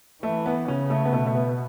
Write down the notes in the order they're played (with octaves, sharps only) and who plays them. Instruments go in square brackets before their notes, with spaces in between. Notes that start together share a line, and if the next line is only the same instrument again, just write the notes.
[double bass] E3 [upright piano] A3
[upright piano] B3
[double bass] C#3 [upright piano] C#4
[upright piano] A3
B3
[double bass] B2 [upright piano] A3
[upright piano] A3
B3